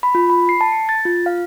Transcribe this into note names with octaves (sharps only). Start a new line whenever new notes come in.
B5
F4
B5
C7
A5
C#7
A6
F4
F5